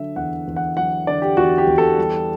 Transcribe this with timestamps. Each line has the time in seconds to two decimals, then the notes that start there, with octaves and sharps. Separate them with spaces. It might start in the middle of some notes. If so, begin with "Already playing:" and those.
Already playing: D3 F#3 E5
0.16 E2 F#5
0.47 E2
0.56 F#5
0.77 F#3 F#5
1.07 D3 D5
1.22 G4
1.37 E2 F#4
1.58 G4
1.67 E2
1.78 A4
1.98 G3